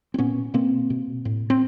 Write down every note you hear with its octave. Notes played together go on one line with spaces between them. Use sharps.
C4
A#2 B3 C#4
B2 A#3 C4
B2
A2
C4